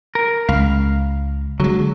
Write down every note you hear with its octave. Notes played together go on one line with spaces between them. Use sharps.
A#4
C#2 F5
D3 F#3 G#3